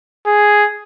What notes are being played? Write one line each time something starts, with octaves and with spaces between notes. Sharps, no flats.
G#4